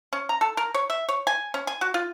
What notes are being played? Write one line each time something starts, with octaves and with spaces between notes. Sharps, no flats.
C#4
A#5
A4
A#4
C#5
E5
C#5
G#5
C#4
G#5
F#4
F4